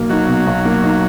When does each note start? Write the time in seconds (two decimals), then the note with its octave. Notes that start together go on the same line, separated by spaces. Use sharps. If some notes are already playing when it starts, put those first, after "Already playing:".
Already playing: B1 B2 A#3
0.10 F#3 D#4
0.28 B2
0.47 B1
0.65 A#3
0.83 D#4